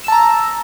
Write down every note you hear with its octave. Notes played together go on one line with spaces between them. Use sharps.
A5 A#5 E6